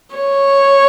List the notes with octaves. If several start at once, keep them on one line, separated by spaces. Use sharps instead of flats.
C#5